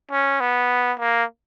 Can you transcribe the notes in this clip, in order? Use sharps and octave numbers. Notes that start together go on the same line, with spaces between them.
C#4
B3
A#3